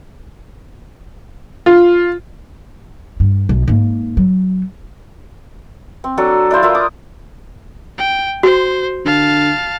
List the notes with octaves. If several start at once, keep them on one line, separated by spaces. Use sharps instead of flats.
F4
G2
B1
G#2 A#3
F#3
C4
F#3 D4 A4 C#6
D4 E4 C5 F5
E4 F4 A#4 E5
D6 D#6
G5
F#4 C5
D3 F5 A5